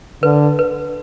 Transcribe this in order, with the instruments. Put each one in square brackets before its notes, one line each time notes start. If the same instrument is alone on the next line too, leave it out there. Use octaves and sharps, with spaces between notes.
[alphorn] D3 [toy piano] B4
[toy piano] B4